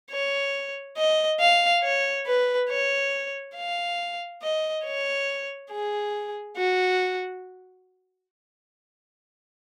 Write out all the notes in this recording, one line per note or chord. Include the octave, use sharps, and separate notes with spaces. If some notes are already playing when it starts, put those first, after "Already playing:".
C#5
D#5
F5
C#5
B4
C#5
F5
D#5
C#5
G#4
F#4